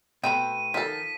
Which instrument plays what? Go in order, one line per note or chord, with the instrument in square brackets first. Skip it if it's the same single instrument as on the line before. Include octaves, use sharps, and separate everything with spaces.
[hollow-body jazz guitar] B2 A3 [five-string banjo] C4 G5 [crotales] D#7
[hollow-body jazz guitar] D#3 [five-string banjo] F3 A4 [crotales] B6